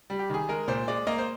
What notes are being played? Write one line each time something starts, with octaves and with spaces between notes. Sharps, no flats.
G3
G4
D#3 G#4
G#3 A#4
A#2 C5
G#3 D5
A#3 D#5
C5